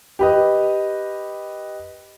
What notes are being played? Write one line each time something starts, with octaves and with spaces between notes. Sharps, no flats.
G4 B4 D#5